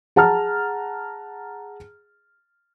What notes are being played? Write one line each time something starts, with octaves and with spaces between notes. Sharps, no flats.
G#4 F#5 A5 A#5 F6